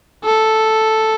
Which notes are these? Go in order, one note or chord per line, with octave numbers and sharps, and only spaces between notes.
A4